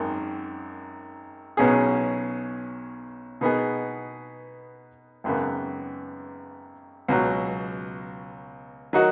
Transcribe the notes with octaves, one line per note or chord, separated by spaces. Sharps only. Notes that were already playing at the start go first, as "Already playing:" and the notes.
Already playing: G#1 F#2 D#3
B1 B2 F#3 C#4 G#4
B2 B3 D#4 G#4
G#1 F#2 C#3 B3
C#2 B2 F#3
D#3 F#3 D#4 F#4